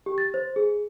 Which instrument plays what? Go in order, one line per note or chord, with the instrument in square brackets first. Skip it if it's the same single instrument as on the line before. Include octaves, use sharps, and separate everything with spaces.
[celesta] G4
A6
C5
G#4